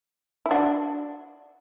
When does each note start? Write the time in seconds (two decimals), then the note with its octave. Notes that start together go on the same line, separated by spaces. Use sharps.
0.46 E4
0.51 D4 F#4